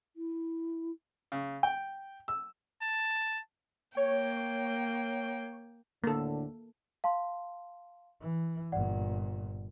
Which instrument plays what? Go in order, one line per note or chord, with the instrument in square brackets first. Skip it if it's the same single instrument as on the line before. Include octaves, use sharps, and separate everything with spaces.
[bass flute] E4
[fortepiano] C#3
G5
E6
[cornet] A5
[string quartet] A#3 G5 [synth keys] C#5
[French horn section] D2 A2 D3 [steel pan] A#3 A4
[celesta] F5 A5 C6
[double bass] E3
[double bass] G1 A#2 [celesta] D5 F#5